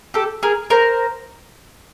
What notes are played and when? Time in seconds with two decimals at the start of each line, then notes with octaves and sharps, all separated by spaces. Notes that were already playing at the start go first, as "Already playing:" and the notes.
0.14 G4 A4
0.43 G#4 A#4
0.70 A#4 C5